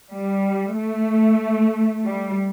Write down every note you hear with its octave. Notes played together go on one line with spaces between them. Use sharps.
G3
A3
G3